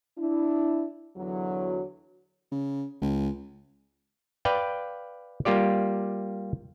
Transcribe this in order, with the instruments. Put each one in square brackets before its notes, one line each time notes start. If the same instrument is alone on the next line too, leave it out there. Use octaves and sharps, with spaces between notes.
[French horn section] D4 E4
E2 D3 F#3
[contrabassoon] C#3
C#2
[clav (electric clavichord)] B4 D5 F5 G5
G3 A#3 F4 G4 D5